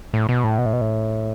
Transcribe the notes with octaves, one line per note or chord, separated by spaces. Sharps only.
A2
B2
A2
B2
A2
B2
A2